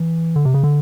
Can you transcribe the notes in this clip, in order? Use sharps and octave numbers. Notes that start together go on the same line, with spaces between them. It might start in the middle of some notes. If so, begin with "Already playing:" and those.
Already playing: E3
D3
C3
C#3
D3